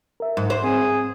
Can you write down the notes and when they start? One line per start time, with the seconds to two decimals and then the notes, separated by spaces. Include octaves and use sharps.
0.20 A#4 E5
0.37 G#2
0.50 C5
0.64 C4 G#4